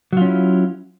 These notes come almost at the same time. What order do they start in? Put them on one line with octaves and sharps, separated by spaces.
F#3 F4 C#4 E4